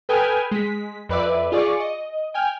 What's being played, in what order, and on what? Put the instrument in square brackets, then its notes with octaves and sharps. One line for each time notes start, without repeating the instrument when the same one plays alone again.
[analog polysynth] A4 B4 G5 G#5 D#6 F6
G#3 B6
F2 B4 D5 E5
F4 G#4 D5 C#6 D6
D#5
G5 G#5 F6